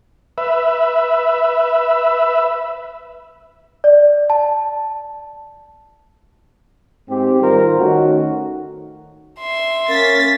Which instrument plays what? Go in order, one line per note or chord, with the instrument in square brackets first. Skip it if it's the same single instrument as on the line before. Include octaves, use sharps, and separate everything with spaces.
[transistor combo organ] B4 E5
[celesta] D5
A5
[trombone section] G#2 G#3 C4 G4
D#3 G3 F4 A#4 C5
D#3 A3 C#4 F#4
[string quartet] E5 C6
[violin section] A#3 A6 B6 [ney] C#4 [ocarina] A#4